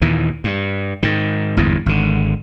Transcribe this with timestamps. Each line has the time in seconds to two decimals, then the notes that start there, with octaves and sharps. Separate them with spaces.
0.02 D#2 A#2 E3
0.44 G2
1.03 G#2 D#3
1.57 G1 E2 G#2 E3
1.86 G#1 D3